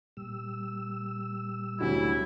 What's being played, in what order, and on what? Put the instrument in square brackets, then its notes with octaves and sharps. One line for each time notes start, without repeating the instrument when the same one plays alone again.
[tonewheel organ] A#2 G3 E6
[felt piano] D2 C3 F#3 [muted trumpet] E4